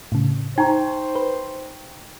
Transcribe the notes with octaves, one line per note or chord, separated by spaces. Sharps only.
A2 C#3
D#4 C5 G5 A#5 C#6
B4